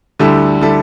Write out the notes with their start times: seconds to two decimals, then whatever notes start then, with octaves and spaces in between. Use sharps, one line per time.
0.19 D2 D3 G3 E4 A4
0.61 D3 G3 E4 A4